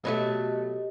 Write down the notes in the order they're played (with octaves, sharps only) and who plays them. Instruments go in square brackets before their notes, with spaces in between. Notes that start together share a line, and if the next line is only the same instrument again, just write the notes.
[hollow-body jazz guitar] B2 F#3 A3 [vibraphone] G4 D#5